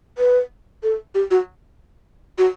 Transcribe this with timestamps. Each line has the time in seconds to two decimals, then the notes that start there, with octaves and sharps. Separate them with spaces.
0.18 B4
0.83 A4
1.15 G4
1.31 F#4
2.38 F#4